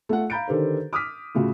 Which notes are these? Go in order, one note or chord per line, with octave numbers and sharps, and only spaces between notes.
A3 F4 F#5
F5 A#5 B5 G6 A6 D7
D3 D#3 G4 A4 B4 C5
D6 D#6 F6 B6
A2 C#3 F4 F#4